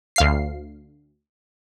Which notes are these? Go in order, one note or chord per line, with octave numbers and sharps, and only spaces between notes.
D2 F5 C7